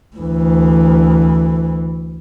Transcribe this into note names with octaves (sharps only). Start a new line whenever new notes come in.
D2 E3